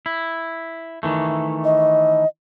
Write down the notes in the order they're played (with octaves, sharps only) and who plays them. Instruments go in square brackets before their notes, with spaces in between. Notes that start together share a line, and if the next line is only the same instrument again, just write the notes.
[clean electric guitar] E4
D#3 E3 A3
[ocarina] D#5